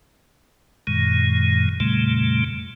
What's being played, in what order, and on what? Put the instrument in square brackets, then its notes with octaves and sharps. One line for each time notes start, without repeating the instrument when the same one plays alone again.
[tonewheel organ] F#2 A#2 D#3 G#3
F2 A#2 C#3 G3 A3